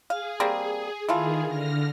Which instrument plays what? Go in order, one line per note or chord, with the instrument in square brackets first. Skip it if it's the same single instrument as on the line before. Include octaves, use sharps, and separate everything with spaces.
[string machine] G#4 [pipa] F5
[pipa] G3 A#3 C4
[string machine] D#3 G#4 [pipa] E3 A3 F4
[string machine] D3 F6 A#6